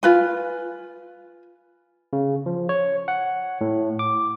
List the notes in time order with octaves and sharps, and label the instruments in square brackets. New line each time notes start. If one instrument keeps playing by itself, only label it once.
[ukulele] F4 B4 G#5
[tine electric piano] C#3
F3
C#5
F#5
A2
D6